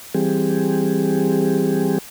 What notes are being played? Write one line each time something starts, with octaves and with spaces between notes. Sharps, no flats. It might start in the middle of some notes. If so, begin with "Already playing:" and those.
E3 G3 C4 G4 G#4